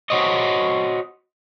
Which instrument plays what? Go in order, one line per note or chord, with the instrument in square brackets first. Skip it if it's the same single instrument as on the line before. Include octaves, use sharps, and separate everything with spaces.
[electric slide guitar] F#4 C5 C#5 D#5